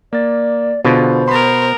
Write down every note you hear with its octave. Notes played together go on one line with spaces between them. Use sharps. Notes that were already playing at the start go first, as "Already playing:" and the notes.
A#3 D5 A6
B2 D3 F4 G#4 C5
B3 A#4 B5 C6